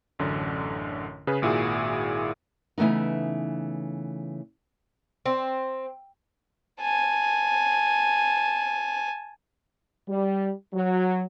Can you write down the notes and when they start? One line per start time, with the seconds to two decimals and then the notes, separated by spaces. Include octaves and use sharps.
0.19 A1 F#2 D3
1.27 C#3 G#4 B4
1.42 G#1 A#2 E4 F#4 G#4
2.78 C#3 E3 A3 B3 D#4
5.26 C4
6.81 G#5 A5
10.09 G3
10.74 F#3